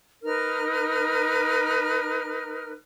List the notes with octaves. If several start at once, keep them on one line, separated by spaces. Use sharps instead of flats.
D#4 A#4 B4 F6